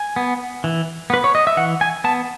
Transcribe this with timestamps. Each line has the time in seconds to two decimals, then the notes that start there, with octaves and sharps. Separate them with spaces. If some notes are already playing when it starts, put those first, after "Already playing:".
Already playing: G#5
0.16 B3
0.64 E3
1.10 B3 B4
1.24 C#5
1.35 D#5
1.47 E5
1.57 E3 F#5
1.81 G#5
2.04 B3 A5